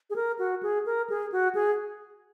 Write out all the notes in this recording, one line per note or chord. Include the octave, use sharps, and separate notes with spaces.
G#4
A#4
F#4
G#4
A#4
G#4
F#4
G#4